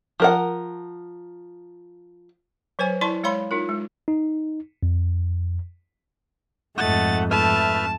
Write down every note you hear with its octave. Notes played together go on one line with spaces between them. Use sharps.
F3 A#4 F#5
F#3 B4 C5 G#5
E4 D5 A5 C6 C#6
G#3 C#5 F5 B5 C6
D#4 F4 A#4
G#3
D#4
F2
F2 G#2 A3 D#5 F#5 A6
A3 B4 E5 A5 F6